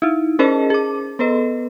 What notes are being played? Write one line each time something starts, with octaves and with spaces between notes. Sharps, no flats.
D#4 E4
C#4 G#4 A#4 C5 D#5 A5
G#4 D6
B3 A4 B4 D#5